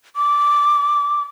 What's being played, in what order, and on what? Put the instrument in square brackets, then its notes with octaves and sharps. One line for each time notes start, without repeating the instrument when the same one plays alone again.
[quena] D6